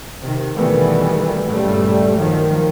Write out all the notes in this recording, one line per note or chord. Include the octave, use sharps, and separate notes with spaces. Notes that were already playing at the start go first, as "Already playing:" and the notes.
C3 D#3
B2 D#3 E3 G3 A3 B3
G2 A#2 C#3 G3 A3
D#3 F3 F#3